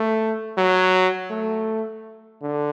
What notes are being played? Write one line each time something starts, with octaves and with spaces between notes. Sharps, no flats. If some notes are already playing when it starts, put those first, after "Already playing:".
Already playing: A3
F#3
A3
D3